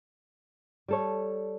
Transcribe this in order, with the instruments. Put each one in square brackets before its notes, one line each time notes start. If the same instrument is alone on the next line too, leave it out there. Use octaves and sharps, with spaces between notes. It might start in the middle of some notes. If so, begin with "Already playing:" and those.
[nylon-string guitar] G3 A4 C#5